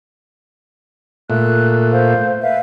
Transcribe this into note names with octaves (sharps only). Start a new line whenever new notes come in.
A#2 A3 F#6
C5 F5
B4 E5 F5